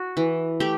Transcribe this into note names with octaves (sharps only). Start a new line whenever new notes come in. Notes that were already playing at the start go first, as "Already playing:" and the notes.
Already playing: F#4
E3
A3 G4